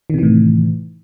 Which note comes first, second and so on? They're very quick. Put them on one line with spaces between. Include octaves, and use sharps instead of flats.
D#3 C3 E3 A2